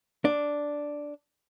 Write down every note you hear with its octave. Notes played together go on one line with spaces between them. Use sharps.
D4